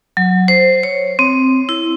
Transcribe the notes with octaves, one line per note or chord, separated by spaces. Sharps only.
F#3
C5
C#5
C4
E4